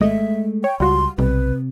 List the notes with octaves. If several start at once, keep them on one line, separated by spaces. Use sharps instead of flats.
G#1 G#3 A3 D#5 E5
C#5 G5
C#2 G3 F4 F#4 C6
B1 C3 G3 B4